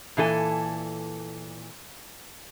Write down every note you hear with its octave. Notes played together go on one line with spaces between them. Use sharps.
A#2 E3 A4 G#5